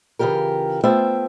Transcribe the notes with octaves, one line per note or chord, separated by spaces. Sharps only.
C#3 E3 F4 G4 A#4
A3 B3 F4 C5 E5 G5